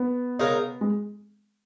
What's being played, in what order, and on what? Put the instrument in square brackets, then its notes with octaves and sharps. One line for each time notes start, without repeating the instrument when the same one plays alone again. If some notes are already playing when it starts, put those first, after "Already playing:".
Already playing: [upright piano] B3
[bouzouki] C#3 G#3 D#4 A#4
[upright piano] G#3